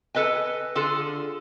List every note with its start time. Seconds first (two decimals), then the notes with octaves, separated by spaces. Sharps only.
0.15 A4 B4 D#5 G#5
0.75 D3 F4 G#4 A4